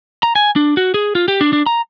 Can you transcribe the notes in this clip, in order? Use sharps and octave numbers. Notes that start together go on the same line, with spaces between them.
A#5
G#5
D4
F#4
G#4
F4
G4
D4
D4
A#5